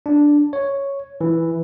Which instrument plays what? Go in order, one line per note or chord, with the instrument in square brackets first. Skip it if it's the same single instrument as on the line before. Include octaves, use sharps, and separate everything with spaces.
[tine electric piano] D4
C#5
E3